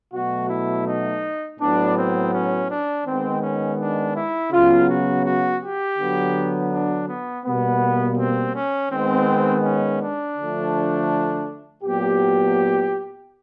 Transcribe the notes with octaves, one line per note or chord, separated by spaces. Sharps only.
B2 F#3 A3 F#4
E4
D#4
A2 F#3 B3 D4
C4
C#4
D4
D#3 G#3 B3 C4
C#4
D4
E4
C#3 F#3 B3 F4
F#4
F#4
G4
D3 F#3 B3
D4
B3
B2 G3 A#3 B3
C4
C#4
D#3 G#3 B3 C4
C#4
D4
D3 F3 A3
A#2 F#3 B3 G4